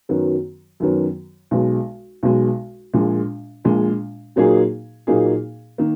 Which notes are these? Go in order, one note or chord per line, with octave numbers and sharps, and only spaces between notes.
F#2 D#3 F#3 B3
F#2 D#3 F#3 B3
B1 B2 G#3
B1 B2 G#3
A#1 A#2 G#3
A#1 A#2 G#3
A#2 F#3 A#3 D#4 G#4
A#2 F#3 A#3 D#4 G#4
D#3 A#3